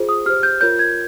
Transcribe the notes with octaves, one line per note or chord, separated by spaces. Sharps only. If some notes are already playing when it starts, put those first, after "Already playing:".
Already playing: F4 G#4 C5
D#6
G4 C5 F6
G6
F4 A#4 C#5 G6
G#6